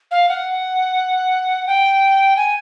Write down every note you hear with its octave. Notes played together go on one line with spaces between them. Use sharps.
F5
F#5
G5
G#5